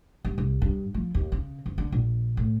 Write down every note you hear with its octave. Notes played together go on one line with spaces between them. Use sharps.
G2
C2
G2
F3
D#2
C#3
F#1
D3
A#1
A2